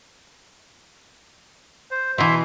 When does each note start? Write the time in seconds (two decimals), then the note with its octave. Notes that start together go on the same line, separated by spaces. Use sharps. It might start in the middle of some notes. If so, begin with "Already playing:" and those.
1.91 C5
2.18 B2 E3 E4 E5 C6